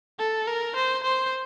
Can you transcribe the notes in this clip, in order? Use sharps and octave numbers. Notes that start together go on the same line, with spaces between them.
A4
A#4
C5
C5